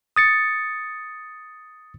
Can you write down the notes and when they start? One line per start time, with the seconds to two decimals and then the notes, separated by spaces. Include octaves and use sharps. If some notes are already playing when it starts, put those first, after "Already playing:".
0.16 D#6 A6 C#7